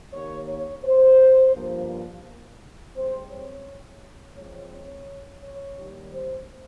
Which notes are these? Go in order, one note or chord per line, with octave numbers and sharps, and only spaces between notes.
D#2 D#3 A#3 C#5
C#5
C5
G2 F3 A#3
G#2 G3 C4 C5
C#5
G#2 F3 C4 C#5
C#5
C#5
D#2 D#3 G3
C5